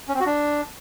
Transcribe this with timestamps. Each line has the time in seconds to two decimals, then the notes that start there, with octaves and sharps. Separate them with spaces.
0.09 C#4
0.15 C4
0.20 F#4
0.26 D4